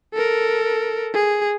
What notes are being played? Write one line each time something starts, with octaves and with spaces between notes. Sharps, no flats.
A4 A#4
G#4